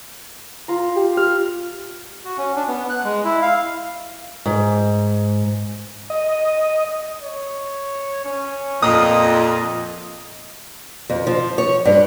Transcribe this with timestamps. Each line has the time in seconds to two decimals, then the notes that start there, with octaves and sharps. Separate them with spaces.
0.68 F4 A#5
0.96 G4
1.17 F5 F6
2.25 F#4
2.38 C#4
2.56 D4
2.67 B3
2.90 F#6
3.04 G#3
3.24 E4
3.42 F5
4.46 G#2
6.10 D#5
7.22 C#5
8.25 C#4
8.82 F2 A#2 D#5 D#6
11.09 F2
11.27 F3
11.58 C#5
11.85 G2